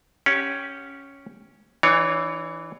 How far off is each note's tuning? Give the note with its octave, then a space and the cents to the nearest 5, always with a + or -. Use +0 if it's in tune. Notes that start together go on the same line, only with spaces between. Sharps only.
C#4 +0 G4 +0 F#5 -25
E3 +0 D4 +45 C#5 +15